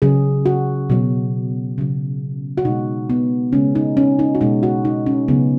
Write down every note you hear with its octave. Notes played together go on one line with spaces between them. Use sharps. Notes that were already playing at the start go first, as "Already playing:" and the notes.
C#3 F#3 G#4
F#4
B2 F#3
C#3 F#3
F#4
B2 G#3 D#4
B3
C#3 G#3 C#4
D#4
C#4
D#4
F#4
B2 G#3 D#4
F#4
D#4
C#4
C#3 F#3 B3